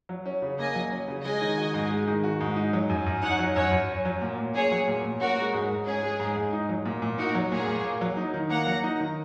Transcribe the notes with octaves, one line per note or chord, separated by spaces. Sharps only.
F#3
C#4
C#3
A#3 D#5 G#5
F#3
C#4
C#3
G#3 D#5 G#5
D#3
F#4
G#2
G#3
D#3
F#4
G#2
D#4
F#3
F#2
F#2
D#4 C#5 F#5
F#3
F#2 C#5 F#5
F#2
C#4
F#3
A#2
A#2
C#4 G#4 C#5
F#3
A#2
A#2
C#4 F#4 A#4
G#3
G#2
G#2
C#4 G#4
G#3
G#2
G#2
D#4
F#3
A#2
A#2
D#4 F#4 A#4
F#3
A#2 G#4 C#5
A#2
A#3
F#3
D#4
D#3
A#3 F#5 A#5
F#3
D#4
D#3